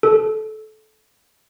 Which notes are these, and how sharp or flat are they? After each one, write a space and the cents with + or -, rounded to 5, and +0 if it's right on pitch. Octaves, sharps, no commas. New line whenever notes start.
A4 -20